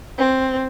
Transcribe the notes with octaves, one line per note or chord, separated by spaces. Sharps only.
C4